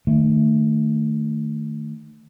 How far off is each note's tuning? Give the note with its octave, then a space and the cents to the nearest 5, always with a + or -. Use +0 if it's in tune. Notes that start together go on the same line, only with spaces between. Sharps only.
D#3 -25 A3 +10